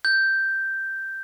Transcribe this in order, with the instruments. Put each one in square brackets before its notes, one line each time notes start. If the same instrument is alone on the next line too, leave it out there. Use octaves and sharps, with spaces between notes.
[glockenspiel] G6